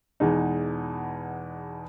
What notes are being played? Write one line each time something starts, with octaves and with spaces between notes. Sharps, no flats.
E2 B2 G#3 D#4